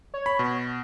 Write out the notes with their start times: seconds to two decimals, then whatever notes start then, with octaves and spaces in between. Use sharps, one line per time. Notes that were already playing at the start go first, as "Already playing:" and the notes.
0.14 C#5
0.26 B5
0.39 B2